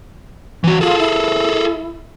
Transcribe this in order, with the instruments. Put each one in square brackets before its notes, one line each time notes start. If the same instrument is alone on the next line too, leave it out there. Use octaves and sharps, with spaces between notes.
[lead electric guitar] E3 F#4
[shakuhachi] F4 [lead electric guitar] G#4 A4
[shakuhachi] E4